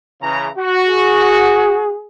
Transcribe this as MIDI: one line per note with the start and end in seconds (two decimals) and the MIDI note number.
0.21 0.48 49
0.21 0.48 52
0.21 0.48 82
0.57 1.92 66
0.86 2.07 68